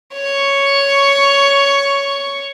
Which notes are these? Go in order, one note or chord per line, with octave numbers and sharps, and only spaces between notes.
C#5 C#6